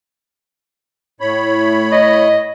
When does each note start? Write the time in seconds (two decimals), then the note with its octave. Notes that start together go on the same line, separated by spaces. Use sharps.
1.20 A2 C#5 B5
1.92 D#5